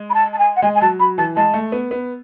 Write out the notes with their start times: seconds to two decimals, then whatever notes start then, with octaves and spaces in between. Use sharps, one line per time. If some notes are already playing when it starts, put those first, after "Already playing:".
Already playing: G#3
0.09 B5
0.14 A5
0.33 A5
0.38 G#5
0.56 F#5
0.62 G#3 G#5
0.75 G#5
0.81 F#3 A5
0.99 F#3 B5
1.18 E3 A5
1.36 G#3 A5
1.54 A3
1.72 B3
1.91 B3